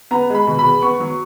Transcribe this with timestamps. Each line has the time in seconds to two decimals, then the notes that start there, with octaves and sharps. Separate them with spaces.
0.11 B3 A#5
0.30 G#3 B5
0.47 B2
0.59 B5
0.64 E2
0.82 B3 C#6
1.00 F#3